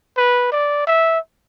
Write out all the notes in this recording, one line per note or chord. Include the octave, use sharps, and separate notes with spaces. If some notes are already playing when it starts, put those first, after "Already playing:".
B4
D5
E5